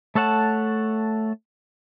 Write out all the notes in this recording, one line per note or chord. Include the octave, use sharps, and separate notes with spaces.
A3 A4 C#5 F#5 A5